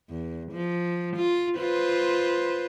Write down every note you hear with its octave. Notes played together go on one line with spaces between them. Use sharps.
E2
F3
F4
F4 B4 C5